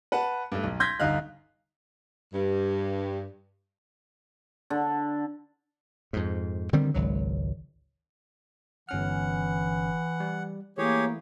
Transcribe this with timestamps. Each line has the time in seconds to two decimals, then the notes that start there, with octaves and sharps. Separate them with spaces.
0.12 B4 F#5 A5
0.52 G2 A3
0.64 B1
0.80 C6 G6 G#6 A#6 B6
1.00 G1 D3 D#4 F5 F#6
2.33 G2
4.70 D3
6.13 F2 G#2
6.73 D3 D#3 G3 C4
6.94 G#1 C#2 F#3
8.89 G1 E3 C#4 F#5 F6
10.20 G3
10.78 E3 A3 A#3 E4 G4 G#4 C#5